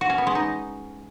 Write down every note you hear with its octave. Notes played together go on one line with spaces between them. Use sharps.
F#4
C#4
B3
G#3
D#4